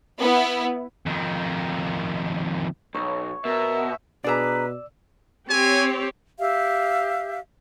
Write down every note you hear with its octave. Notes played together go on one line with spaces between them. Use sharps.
B3 E4
F2 D#3
B1 C#5
B2 A#4 E5
B2 D4 G#4 B4 D5 A#5 E6
C4 G4 C#5 G#5
G4 E5 F5